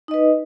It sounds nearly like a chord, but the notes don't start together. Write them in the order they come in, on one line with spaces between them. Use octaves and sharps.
D#4 D#5 B4